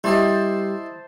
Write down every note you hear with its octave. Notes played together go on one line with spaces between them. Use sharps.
G3 E4 G4 C5 D5 D#5 A5